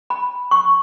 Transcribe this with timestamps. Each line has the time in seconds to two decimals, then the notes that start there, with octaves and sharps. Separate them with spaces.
0.10 B5
0.51 C#6